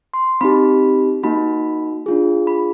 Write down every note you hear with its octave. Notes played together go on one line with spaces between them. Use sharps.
C6
C4 D#4 G4 B5
A#3 D#4 F#4 B5
D4 F4 G#4
B5